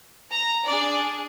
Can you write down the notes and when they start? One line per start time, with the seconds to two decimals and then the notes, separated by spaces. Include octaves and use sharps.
0.29 A#5
0.66 D4 G#4 D5